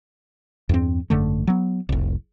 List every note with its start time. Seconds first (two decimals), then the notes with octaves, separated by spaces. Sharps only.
0.69 E2 G2 C4
1.10 G#1 F#2 D3 A3
1.47 F#3 B3
1.89 F1 C2